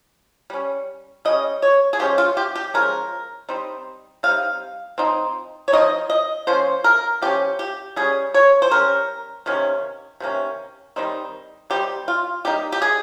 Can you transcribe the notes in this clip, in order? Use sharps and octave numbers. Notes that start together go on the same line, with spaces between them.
G3 C#4
G3 C#4 D#5
C#5
G#4
F3 G#3 C#4 G4
F4
G4
G4
F3 G#3 C#4 A#4
G3 C4 D#4
G3 C4 D#4 F5
F3 C4 D#4
C#5
C4 D#4 D#5
F3
D#5
F3 A#3 C#4 C5
A#4
F3 A#3 C#4 G4
G4
G3 C#4 G#4
C#5
C5
G3 C#4 A#4
C3 D#3 A#3 C#4
C3 D#3 A#3 C#4
D#3 G3 C4 D#4
D#3 G3 C4 D#4 G4
F4
G3 A#3 D#4 G4
G4
G#4